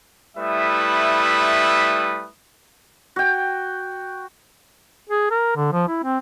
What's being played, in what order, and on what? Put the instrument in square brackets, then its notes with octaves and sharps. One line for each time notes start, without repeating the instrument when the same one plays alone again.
[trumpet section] G3 A3 E4 B4 E5 D#6
[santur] F#4 G5
[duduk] G#4
A#4
D3
F3
E4
C4